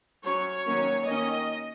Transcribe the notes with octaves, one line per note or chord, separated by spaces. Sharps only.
F#3 C#4 C#5
D#3 F#3 A#3 C#4
D#3 A#3 C#4 D#5